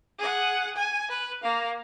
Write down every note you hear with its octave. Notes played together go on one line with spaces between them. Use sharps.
G#4 F#5
G#5
B4
A#3 F5